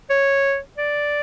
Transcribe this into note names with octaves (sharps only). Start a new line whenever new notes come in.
C#5
D5